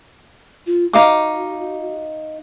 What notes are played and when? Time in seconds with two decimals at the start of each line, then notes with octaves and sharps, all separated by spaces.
0.67 F4
0.93 D#4 F#4 F5 D6